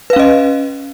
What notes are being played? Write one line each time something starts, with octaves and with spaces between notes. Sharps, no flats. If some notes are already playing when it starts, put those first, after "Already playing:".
C#4 B4 D#5 F5